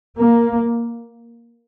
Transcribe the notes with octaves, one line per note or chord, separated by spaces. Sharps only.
A#3